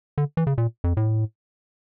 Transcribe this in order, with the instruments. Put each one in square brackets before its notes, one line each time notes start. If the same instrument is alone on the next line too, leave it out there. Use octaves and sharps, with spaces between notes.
[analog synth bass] D3
E3
C#3
A#2
F2
A2